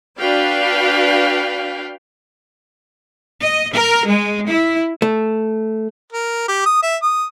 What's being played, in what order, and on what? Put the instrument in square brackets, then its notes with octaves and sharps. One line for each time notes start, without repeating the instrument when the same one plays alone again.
[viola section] D4 F#4 B4 F5 G5
[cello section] D#5
A#4
G#3
E4
[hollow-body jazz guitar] A3
[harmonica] A#4
G4
D#6
E5
D#6